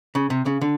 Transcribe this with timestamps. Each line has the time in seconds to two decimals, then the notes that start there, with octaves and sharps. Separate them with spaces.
0.15 C#3
0.30 C3
0.46 C#3
0.61 D3